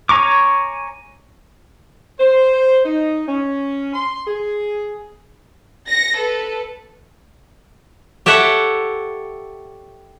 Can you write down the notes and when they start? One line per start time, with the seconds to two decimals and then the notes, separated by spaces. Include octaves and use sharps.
0.09 C#5 G#5 A#5 C#6 D6
2.20 C5
2.85 D#4
3.28 C#4
3.93 C6
4.26 G#4
5.88 A#6 C#7
6.17 A4 B4
8.26 G4 A4 C#5 E5 F#5